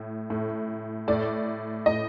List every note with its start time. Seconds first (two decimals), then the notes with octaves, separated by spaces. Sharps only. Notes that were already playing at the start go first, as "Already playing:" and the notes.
Already playing: A2
0.30 A2
1.08 A2 D5
1.86 A2 D#5